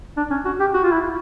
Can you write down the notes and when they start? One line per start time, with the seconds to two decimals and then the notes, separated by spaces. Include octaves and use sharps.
0.17 D4
0.31 C#4
0.45 F#4
0.60 G4
0.74 F#4
0.84 F4
0.92 E4